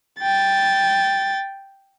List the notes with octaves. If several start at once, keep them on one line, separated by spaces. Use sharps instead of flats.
G5 A6